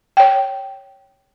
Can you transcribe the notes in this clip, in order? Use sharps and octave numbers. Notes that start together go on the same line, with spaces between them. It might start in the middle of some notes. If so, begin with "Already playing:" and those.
C#5 G5